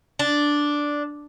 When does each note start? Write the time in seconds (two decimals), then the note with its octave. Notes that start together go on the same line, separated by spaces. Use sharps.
0.19 D4